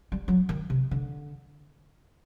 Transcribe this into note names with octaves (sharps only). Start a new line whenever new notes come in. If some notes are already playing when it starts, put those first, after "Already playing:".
G3
F#3
D#3
C3
D3